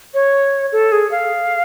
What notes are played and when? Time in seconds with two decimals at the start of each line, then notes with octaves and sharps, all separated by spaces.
0.14 C#5
0.72 A4
0.92 G#4
1.11 F5